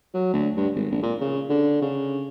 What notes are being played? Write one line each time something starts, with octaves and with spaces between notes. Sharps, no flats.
F#3
D2
G2
G#1
A#1
A#2
C#3
D3
C#3